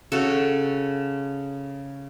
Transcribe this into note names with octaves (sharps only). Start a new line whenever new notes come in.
C#3 F#4 A4